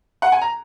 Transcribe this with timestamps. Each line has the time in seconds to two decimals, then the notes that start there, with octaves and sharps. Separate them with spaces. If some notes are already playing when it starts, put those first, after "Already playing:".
0.22 F#5
0.32 G#5
0.41 A#5